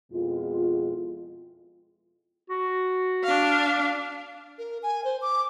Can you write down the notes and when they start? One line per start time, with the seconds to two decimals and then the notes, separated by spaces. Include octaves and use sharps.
0.12 F2 B2 G#3 E4 F4
2.50 F#4
3.24 D4 F5
4.59 A#4
4.83 G#5
5.04 C5
5.22 D6